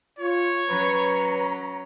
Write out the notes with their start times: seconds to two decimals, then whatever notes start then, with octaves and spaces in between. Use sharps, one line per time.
0.19 F4 C#5
0.69 F#3 C#4 B4 A#5